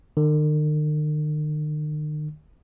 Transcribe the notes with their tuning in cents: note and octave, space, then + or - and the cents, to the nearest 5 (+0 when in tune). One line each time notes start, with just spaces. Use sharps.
D#3 -45